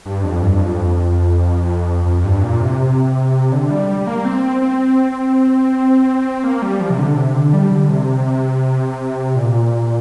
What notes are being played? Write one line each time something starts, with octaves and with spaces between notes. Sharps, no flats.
G2
F2
G2
F2
F2
G2
A#2
C3
D3
G3
G3
G3
A#3
C4
C4
A#3
G3
F3
C3
D3
C3
D3
G3
D3
C3
A#2